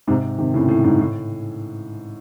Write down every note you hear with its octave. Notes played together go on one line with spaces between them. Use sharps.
G#2 C3
C3 D#3
A2 C#3
A2
G#2
A2